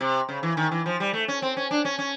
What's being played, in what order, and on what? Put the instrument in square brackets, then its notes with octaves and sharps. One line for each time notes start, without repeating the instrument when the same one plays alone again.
[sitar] C3
C#3
E3
D#3
E3
F3
G3
A3
C#4
C4
C#4
D4
C#4
C#4